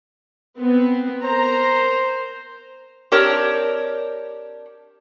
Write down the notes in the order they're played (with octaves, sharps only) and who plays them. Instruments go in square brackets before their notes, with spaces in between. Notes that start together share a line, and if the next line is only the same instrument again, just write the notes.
[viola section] B3 C4
[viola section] A#4 A#5 [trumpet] C5
[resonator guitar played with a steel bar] C4 D4 G4 A#4 C#5